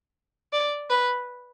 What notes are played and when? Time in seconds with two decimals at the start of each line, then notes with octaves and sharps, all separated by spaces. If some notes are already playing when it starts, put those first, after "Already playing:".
0.53 D5
0.89 B4